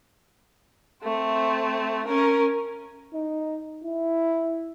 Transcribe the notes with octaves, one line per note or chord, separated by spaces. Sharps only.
A3 C4
C#4 A#4
D#4
E4